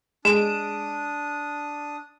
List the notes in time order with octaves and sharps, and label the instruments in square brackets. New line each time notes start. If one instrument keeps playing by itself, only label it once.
[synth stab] G#3 D7 [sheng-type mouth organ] D4 D#6 [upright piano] E7